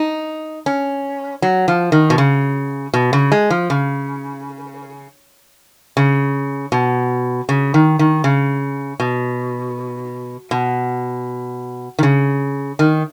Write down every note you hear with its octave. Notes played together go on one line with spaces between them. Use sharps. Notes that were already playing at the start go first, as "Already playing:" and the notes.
Already playing: D#4
C#4
F#3
F3
D#3
B2
C#3
B2
C#3
G#3
F3
C#3
C#3
B2
C#3
D#3
D#3
C#3
B2
B2
D#3
C#3
D#3